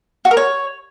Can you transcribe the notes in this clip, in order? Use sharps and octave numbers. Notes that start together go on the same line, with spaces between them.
F#4
A#4
C#5